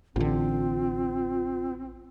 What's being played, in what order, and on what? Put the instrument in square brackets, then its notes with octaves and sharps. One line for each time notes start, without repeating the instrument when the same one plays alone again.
[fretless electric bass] A1 D3 [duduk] C4 [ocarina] F4